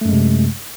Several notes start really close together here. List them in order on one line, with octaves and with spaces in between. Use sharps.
A3 F#2 G#3 C3